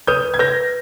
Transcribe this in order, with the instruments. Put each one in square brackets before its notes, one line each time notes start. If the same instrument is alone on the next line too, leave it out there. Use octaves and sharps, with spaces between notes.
[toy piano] B4 [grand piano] D#6 G6
[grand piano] G#6
[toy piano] B4 [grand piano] G6 A#6